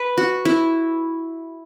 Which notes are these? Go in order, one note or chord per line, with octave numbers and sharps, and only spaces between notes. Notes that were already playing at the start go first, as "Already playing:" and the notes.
Already playing: B4
F#4
E4